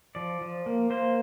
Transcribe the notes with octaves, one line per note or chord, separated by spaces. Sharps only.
F3 D5
F3
A#3
A#3 C5